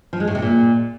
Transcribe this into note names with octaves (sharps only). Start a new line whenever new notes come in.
F3
G#3
A2
C3
A#2